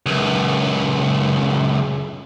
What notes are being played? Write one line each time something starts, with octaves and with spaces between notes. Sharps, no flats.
C#2 F#2